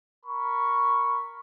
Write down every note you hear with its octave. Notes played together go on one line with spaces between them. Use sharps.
A#4 B5 C#6